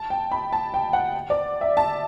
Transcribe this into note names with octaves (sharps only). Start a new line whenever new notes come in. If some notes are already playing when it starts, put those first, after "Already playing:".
Already playing: A5
G5
B5
A5
G5
F#5
D5
E5
A5